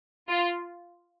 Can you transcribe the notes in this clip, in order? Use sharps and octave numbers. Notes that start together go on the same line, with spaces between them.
F4